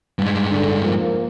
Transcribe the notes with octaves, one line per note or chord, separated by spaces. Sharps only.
G2 G#3
D3
F3 A#3